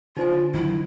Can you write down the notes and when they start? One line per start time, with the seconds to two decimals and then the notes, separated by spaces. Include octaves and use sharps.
0.17 D3 D#4 F4 C5 G#5
0.54 D#3 F#3 E4